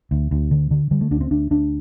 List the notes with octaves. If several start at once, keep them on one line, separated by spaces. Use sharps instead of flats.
D2
D2
D3
D3
D3 G3
A3
D2 D4
C4
D2 D4
D2 D4